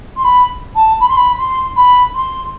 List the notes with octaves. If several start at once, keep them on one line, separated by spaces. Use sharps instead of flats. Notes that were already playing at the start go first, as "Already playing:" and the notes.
C6
B5
A5
B5
C6
B5
C6
B5
C6